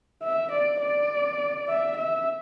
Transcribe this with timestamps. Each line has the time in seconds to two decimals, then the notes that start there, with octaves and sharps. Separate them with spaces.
0.23 E5
0.52 D5
0.82 D5
1.68 E5
1.97 E5